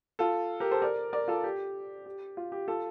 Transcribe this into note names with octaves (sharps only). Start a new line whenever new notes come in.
F4 A4
G4 A#4
A4 C5
A#4 D5
A#4 D5
F4 A4
G4
G4
F4
G4
F4 A4